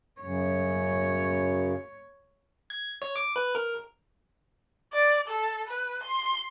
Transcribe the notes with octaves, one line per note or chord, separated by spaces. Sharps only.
F#2 C#3 C#5
G#6
C#5
D6
B4
A#4
D5
A4
B4
C6